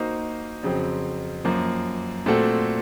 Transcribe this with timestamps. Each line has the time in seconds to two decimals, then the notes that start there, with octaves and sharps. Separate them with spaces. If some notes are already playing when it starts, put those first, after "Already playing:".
Already playing: A#3 D#4 F#4 C5
0.63 F2 C#3 F#3 C4
1.45 F#2 F3 A#3
2.26 A#2 A3 C4 F#4 A4